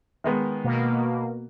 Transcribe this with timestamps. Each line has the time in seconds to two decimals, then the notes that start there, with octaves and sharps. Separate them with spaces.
0.24 D#3 G#3 B3
0.64 B2 A#3